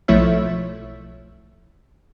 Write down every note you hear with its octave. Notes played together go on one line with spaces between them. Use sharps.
B1 F3 A3 E4 C#5 E5